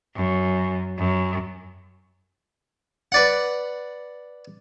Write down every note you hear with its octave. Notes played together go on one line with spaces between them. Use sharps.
F#2
F#2
B4 D5 F#5